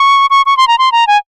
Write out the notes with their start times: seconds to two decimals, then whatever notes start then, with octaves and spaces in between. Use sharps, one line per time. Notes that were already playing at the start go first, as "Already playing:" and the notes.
Already playing: C#6
0.30 C#6
0.46 C#6
0.57 C6
0.68 A#5
0.78 C6
0.92 A#5
1.07 G#5